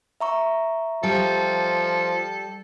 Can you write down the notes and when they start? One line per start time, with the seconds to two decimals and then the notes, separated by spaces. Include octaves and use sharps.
0.21 E5 A#5 C#6
1.03 F3 G3 A4